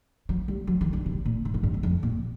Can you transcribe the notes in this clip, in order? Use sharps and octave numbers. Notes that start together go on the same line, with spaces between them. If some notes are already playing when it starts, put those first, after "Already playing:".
F#3
G3
F#3
D#3
D3
C3
A#2
G#2
F#2
G2
E2
F2
A#2